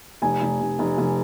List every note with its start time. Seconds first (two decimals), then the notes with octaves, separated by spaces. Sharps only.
0.22 F1 G#5
0.42 F1
0.60 F1
0.79 F1
0.98 F1